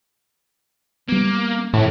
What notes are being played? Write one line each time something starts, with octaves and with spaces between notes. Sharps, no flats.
G3 A#3 B3
A2 C3 E3